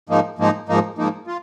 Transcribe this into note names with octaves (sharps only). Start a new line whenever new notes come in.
G#2 F3 A#3 D#4
G#2 F3 A#3 D#4
G#2 F3 A#3 D#4
G#2 F3 A#3 D#4
F4